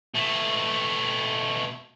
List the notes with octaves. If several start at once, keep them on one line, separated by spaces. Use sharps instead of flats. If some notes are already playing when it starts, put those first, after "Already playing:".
B2 A3